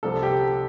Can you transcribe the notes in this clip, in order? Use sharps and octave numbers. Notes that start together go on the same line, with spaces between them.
C2 C3 F3 A4
G4